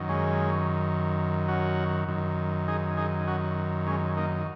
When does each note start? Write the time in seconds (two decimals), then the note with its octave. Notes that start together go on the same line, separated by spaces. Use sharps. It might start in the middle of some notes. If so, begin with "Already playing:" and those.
Already playing: F#2 D#3
0.09 G#3 C#4
1.48 C#4 F#4
2.08 F#2 D#3
2.68 D#4 G#4
2.97 D#4 G#4
3.27 C#4 F#4
3.87 G#3 C#4
4.17 A#3 D#4